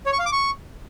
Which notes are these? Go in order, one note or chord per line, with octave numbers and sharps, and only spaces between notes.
C#5
C#6
F5
D6
C#6